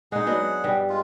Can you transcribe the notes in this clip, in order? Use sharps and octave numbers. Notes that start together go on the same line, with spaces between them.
G#3 D#4 G#4 F#5
F#3 B3 D4
G2 G3
G#3 F4